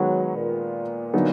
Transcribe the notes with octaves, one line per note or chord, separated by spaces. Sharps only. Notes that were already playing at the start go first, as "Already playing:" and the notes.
Already playing: D#3 F#3 G#3 B3
A#2
D3 F#3 B3 D#4